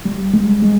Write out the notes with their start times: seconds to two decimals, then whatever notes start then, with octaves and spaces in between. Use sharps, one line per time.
0.05 G3
0.34 G#3
0.62 G#3